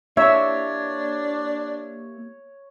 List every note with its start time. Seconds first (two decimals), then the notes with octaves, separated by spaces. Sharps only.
0.17 A#3 D4 E4 G4 C#5 E5